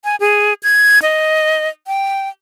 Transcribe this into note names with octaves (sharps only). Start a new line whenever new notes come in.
G#5
G#4
G#6
D#5
G5